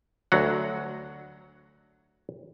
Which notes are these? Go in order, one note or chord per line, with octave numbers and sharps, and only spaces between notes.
D2 F#3 F#5